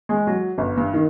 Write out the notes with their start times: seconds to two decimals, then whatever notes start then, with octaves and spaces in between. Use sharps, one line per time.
0.09 G#3
0.27 F#3
0.58 G1
0.77 G2
0.94 D#3